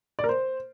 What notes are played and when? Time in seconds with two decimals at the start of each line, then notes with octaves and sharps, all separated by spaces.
0.19 D5
0.24 A#4
0.29 C5